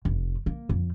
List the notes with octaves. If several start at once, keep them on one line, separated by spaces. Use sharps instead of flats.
F1
A#3
F2